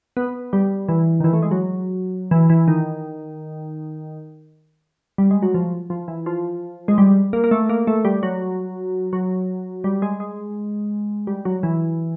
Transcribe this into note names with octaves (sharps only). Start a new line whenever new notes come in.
B3
G3
E3
D#3
E3
A3
G#3
F#3
E3
E3
D#3
G3
G#3
F#3
F3
F3
E3
F3
G#3
G3
A#3
A#3
A3
A#3
A3
G3
F#3
F#3
G3
G#3
G#3
G3
F#3
E3